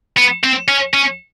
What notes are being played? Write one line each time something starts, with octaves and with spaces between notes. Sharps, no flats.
B3
C4
C#4
C#4